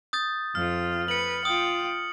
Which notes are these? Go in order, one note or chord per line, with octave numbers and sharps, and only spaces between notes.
D#6 G6 A6
F2 F4 F6
B4 C#7 F#7
F4 G5 D#6